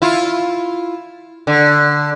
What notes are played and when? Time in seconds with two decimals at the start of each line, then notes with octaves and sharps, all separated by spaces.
0.02 E4 F4
1.47 D3